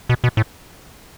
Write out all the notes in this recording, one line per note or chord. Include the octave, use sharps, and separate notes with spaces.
B2
B2
A2